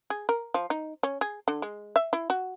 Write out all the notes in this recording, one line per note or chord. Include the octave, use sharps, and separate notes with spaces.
G#4
A#4
F3
D#4
C#4
G#4
D3
G#3
E5
E4
F#4